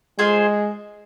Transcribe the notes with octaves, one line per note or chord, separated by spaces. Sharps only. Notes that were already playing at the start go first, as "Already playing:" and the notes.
G#3 F4 G#4 C5 G#5